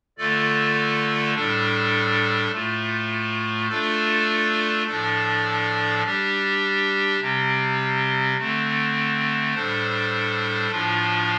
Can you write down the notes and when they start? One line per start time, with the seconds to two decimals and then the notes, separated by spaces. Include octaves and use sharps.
0.18 D3 A3 F4 A4 D5
1.35 A2 G3 D4 A4
2.52 A2 A3 F4
3.69 A3 D4 F4 A4 D5
4.86 A2 F3 D4 A4 D5
6.03 G3 D4 G4
7.20 C3 G3 C4
8.38 D3 A3 C4
9.54 A2 G3 D4 A4 C5
10.71 A2 F3 D4 F4